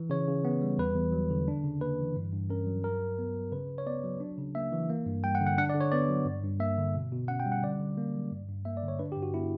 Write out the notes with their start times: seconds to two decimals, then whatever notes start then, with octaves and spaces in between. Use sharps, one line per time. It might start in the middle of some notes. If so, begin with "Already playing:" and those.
Already playing: E3
0.10 C#3 C#5
0.28 C#3
0.45 B3
0.62 G3
0.78 E2 B4
0.96 E2
1.12 F#3
1.30 D3
1.48 D4
1.64 C#3
1.81 A#3 B4
1.99 E3
2.16 G2
2.33 G2
2.50 C#4 A#4
2.67 F#3
2.83 G2 A#4
3.01 G2
3.19 B3
3.35 F#3
3.52 C#3 B4
3.69 C#3
3.78 C#5
3.87 B3 D5
4.04 F#3
4.20 D4
4.38 C#3
4.55 A#3 E5
4.72 E3
4.90 A#3
5.06 G2
5.24 G3 G5
5.35 F#5
5.41 D3
5.47 F#5
5.58 D4 F#5
5.69 D5
5.74 D3
5.80 C#5
5.92 B3 D5
6.09 F#3
6.26 G2
6.44 G2
6.60 A#3 E5
6.78 D3
6.95 B2
7.12 B2
7.28 C#4 F#5
7.40 G5
7.46 G3
7.52 F#5
7.63 D3 D5
7.80 D3
7.98 A#3
8.14 F#3
8.32 G2
8.49 G2
8.65 A#3 E5
8.77 D5
8.83 D3
8.88 C#5
8.99 D4 B4
9.12 G4
9.17 G2
9.23 F#4
9.34 B3 E4